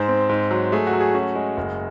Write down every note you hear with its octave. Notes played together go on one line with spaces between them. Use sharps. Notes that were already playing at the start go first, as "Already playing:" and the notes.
Already playing: G#2 C5
C4
G#2
F#3
A3 G#4
F#4
F#3
G#4
C#4 F#4
G#3
F#1